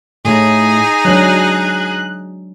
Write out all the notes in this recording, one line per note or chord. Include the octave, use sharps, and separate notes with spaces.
A2 D#4 G#4
F#3 G#3 D4 F#6